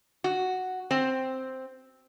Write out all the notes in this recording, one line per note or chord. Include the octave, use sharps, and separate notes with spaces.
F#4
C4